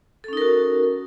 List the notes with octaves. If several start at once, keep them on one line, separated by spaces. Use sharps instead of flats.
C#4 D#4 F#4 A4 A#4